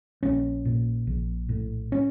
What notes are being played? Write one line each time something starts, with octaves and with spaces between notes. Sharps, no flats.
A#1 C#4
A#2
A#1
A2
C#4